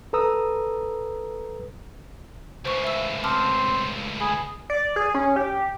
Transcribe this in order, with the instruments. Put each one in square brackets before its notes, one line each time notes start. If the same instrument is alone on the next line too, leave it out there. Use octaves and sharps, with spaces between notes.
[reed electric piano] A4 B4 A#5 D#6 E6
[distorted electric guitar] C#2 A2 [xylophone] C5 C#6
[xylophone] E5 E6
[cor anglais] C4 [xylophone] A5 D6 F6
[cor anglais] G#4 [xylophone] B5
[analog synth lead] D5
G#4
C#4
G4